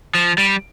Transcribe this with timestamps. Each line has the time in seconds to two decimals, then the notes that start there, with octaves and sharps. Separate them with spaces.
0.15 F3
0.38 G3